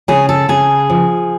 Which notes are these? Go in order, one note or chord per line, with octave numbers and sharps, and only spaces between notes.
C#3 G#4
A4
C#3 G#4
F3